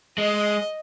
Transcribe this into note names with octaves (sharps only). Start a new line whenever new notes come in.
G#3 D#5